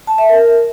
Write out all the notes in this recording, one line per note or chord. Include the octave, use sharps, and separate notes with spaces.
A5
E5
A#4